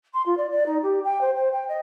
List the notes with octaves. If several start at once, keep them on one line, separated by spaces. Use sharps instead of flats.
C6
F4
D5
D5
D#4
G4
G5
C5
C5
G5
D#5